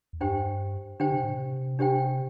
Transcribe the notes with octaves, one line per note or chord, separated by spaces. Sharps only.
E2
G2 D4 G4 C5 G5
D3 D4 G4 C5 G5
C3
A2
C3
D4 G4 C5 G5